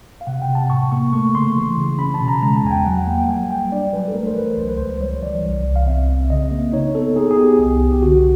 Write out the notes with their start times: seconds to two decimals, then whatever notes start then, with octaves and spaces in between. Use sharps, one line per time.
0.21 F5
0.27 C3 F#5
0.42 G5
0.49 C3
0.55 A5
0.70 A2 C#6
0.92 A#3 C#6
1.13 A3 C#6
1.35 C#3 C6
1.56 E3
1.77 C#3
1.99 C#4 B5
2.14 A5
2.21 B2
2.28 A#5
2.42 G#3 A#5
2.56 A5
2.64 E2 G#5
2.71 G5
2.85 F#3 F#5
3.07 A#3 G5
3.18 G5
3.28 G3 G#5
3.50 G3 G5
3.72 D4 D5
3.92 F#3 B4
4.08 A4
4.14 A3 A#4
4.27 C5
4.36 E3 B4
4.57 C#2 C5
4.68 B4
4.78 C#2 C5
5.00 G3 C#5
5.22 E3 D5
5.43 C2
5.66 C2
5.76 F5
5.87 C4 E5
6.09 C4
6.30 C#3 D#5
6.51 A#3
6.73 D#4 C#5
6.95 B3 A4
7.16 D#4 G#4
7.31 G#4
7.37 B3 G4
7.59 C2
7.80 C2
7.93 G4
8.02 D3 F#4